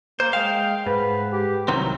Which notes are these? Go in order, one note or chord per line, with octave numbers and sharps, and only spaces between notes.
A#3 C5
G#3 F5 G5
G#2 B4
G4
C2 D#3 F#3 C4